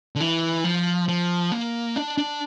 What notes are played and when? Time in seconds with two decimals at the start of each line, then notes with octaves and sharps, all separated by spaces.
0.16 D3
0.20 E3
0.64 F3
1.08 F3
1.52 A#3
1.96 D4
2.18 D4